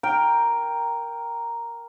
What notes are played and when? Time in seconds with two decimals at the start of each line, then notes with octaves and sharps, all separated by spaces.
0.03 A#4 G5